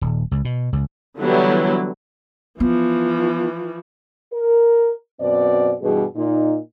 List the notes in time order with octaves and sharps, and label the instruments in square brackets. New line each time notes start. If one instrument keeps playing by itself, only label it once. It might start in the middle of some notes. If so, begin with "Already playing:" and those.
[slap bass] D#1
C#2
B2
C#2
[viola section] D3 E3 F#3 G3 B3 E4
[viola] E3 F3 [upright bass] B3
[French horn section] A#4
F#2 B2 C4 D5
G2 B2 E3 G3 G#4
A#2 D#4